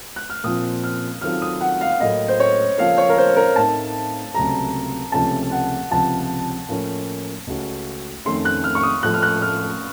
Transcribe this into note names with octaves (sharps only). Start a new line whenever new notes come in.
F#6
F6
A#2 F3 C4 F4 D#6
F6
D#3 F#3 C4 F4 A4 F6
D#6
F#5
F5
F5
A2 F#3 A#3 D#5
C5
C#5
C#3 F3 A#3 F4 A4 F5
C#5
A#4
C5
A#4
A2 A3 C4 D#4 A#4 A5
C#2 C3 F#3 A3 A#5
C#2 C3 F3 A3 C#4 A5
F#5
C#2 C3 F3 A5
A2 F3 A#3 C#4
C#2 C#3 A3 C#4 F#4
F2 D#3 A3 C#4 C6
F#6
F6
C#6
D#6
A2 F3 A3 F#6
F6
F#6
F6